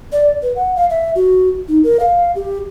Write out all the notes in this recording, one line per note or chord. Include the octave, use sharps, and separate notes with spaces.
D5
B4
F#5
F5
E5
F#4
D#4
A#4
F5
G4